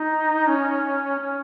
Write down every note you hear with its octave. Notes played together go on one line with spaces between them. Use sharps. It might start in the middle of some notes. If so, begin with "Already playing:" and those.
Already playing: D#4
C#4
C#4